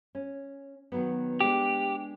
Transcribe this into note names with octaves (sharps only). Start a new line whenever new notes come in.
C#4
D#3 F#3 B3
G#3 D4 G4